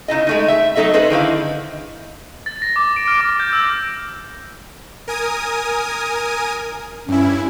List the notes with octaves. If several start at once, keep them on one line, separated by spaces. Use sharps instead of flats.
C#3 D#4 E4 D#5
G#3 A3 D#4
E5
F#3 A3 D#4 A4 D#5 E5
G#4 A4 B4 C5 D#5
D3 D#3 E4 F5
A6
A#6
D6
D7
F6
D6
G6
E6
A#4 G#5 D#6
G2 C#4 E4